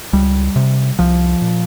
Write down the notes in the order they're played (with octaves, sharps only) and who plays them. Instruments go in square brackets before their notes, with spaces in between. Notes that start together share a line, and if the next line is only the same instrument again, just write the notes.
[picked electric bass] C#2 G3
C3
C2 F3
A#2